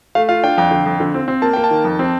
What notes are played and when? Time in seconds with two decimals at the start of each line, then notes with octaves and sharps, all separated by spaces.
0.15 A3 F5
0.28 F4 F5
0.43 D4 G5
0.58 F2 G5
0.71 D3
0.86 F2
1.00 D3
1.14 C4
1.28 C4
1.42 A#3 A5
1.53 A#3 G5
1.64 A5
1.71 D#3
1.84 F2
1.99 C4